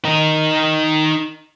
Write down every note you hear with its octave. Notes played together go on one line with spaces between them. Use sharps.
D#4 A#4